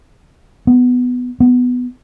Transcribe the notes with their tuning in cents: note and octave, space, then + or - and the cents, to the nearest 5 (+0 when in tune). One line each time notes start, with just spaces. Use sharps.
B3 +10
B3 +10